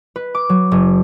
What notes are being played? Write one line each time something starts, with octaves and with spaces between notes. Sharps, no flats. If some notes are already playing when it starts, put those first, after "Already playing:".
B4
D6
F#3
F#1